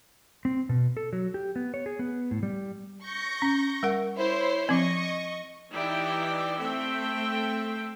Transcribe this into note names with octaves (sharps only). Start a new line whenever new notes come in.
C4
B2
A4
F#3
G4
B3
C#5
G#4
B3
A2
G3
C#6 G6 A#6
C#4
G3 A#4 F#5
E4 C5 C#5
F3 C4 D#5 C#6
E3 D#4 E4 G4 D5 G5
A3 C4 A4 E5 G5